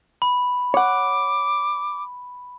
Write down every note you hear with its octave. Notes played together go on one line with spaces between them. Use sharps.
B5
C#5 F#5 D6